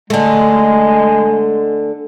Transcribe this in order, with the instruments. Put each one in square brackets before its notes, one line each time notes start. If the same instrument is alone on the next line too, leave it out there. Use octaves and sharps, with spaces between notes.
[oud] D3 A3 [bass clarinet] G#3